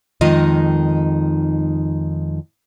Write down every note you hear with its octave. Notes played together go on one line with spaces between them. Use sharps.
F2 D#3 G#3 D#4 F4 D#5